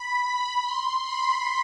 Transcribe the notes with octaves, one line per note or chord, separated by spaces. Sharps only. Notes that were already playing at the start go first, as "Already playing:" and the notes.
Already playing: B5
B5
C6
B5